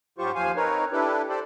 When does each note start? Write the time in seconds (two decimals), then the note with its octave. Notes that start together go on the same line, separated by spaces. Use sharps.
0.18 G#2 F#3 F4 G4 C5 C#6
0.35 D#2 F3 C5 F5 G#5
0.56 C4 D#4 A#4 B4 C#5
0.92 D4 E4 G4 A4 B4
1.29 G4 A4 C5 D5